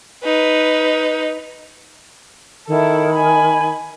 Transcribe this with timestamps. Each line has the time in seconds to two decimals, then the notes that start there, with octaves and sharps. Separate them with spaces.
0.23 D#4 B4
2.68 D#3 E4 A4
3.14 G#5 B5